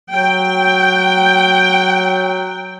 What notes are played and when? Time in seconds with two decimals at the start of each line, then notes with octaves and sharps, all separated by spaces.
0.10 F#3 G5